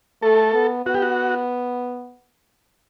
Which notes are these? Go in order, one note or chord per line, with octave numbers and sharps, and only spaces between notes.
A3 A4
B3
B3 F#4
G4
F#4